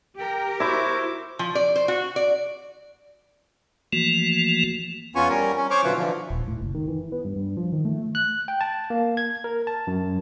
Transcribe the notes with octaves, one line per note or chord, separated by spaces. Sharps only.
G4 A#4 G5
E4 F#4 C5 E5 D6
F3
D5
C5
F#4
D5
E3 F3 A3 A#3 F#4
E2 B3 C#4 F4 G#5 C#6
G3 C#4 A#4
C#4
C5 C#5 C#6 D6 F6
B2 D3 F#3 E4 F4 B4
D3 E3 F3
D#1
A2
F#1
D#3
E3
B3
G2
G2
F3
D#3
A3
F#6
G5
A5
A#3
G#6
A#4
A5
F#2